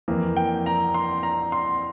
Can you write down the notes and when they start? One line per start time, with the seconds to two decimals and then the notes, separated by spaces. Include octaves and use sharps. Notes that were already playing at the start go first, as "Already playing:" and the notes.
0.08 F2 E3 A#3
0.37 G5
0.66 A#5
0.94 C6
1.23 A#5
1.52 C6